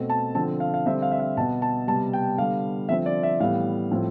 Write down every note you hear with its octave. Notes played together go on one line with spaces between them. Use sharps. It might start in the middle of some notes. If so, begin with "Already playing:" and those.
Already playing: B2 A3 C4
A5
D3 F3 C4 A5
F5
F5
D3 G3 C4 E5
F5
E5
F5
B2 B3 A5
A5
C3 G3 B3 A5
G5
D3 G3 B3 F5
D3 F3 C4 E5
D5
E5
A2 E3 G3 B3 F5
A2 F3 C4